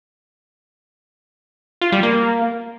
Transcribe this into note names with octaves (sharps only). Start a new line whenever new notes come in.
F4
G3
A#3